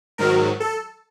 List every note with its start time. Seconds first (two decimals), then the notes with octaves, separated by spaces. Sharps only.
0.18 G#2 D#3 F#3 A#4
0.60 A4